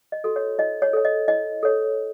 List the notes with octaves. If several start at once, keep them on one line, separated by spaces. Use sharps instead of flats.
D#5
F#4 A4
C#5
E4 D#5
C#5
A4 C#5
D#5
E4 D#5
A4 C#5